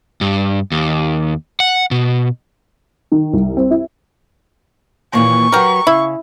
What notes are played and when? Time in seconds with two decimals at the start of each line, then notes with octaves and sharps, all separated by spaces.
0.21 G2
0.72 D#2
1.60 F#5
1.91 B2
3.12 D#3
3.33 C2
3.57 C4
3.71 E4
5.13 D#2 A#2 E3 C#6
5.52 F#3 F#4 G4 A#4 B4
5.87 C#3 E4